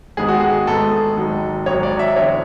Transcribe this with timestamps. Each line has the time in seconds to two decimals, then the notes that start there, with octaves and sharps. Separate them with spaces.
0.17 G#1 G#2 G#3 B3 G#4
0.28 F#4
0.40 G#4
0.67 G#1 G#2 G#3 B3 A4
1.17 G#1 G#2 F#3
1.66 G#1 G#2 F#3 C#5
1.83 D5
1.99 E5
2.16 E2 D3 F#3 C#5